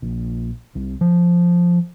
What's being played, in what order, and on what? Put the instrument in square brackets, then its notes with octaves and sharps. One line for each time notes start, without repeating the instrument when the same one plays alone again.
[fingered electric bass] A#1
C2
F3